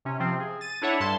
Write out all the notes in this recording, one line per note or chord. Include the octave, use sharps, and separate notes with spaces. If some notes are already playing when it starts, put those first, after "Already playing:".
C3 C#4
C3 F3 C4
G#4
A6 D#7
D4 E4 A4 C#5 E5 F#5
G2 G3 A5 C6